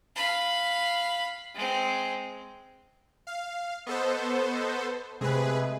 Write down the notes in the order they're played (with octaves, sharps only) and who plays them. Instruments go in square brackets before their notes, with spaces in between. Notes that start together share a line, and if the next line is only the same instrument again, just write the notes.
[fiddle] F5 B5
G#3 C4
[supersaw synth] F5
[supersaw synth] B3 A4 C5 [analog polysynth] D#5 C#6
[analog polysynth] C3 G#3 A3 [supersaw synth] G#4 B4